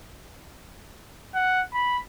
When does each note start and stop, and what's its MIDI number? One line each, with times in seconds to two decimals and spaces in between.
1.35 1.62 78
1.74 1.98 83